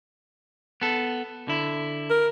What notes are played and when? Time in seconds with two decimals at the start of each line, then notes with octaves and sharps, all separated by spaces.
0.82 B3 A4
1.48 D3 E4
2.10 A#4